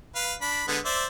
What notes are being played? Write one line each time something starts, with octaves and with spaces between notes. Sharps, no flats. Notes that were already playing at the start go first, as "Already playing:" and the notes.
B4 F5
D4 B5
D3 G#3 B3
C5 D5 E5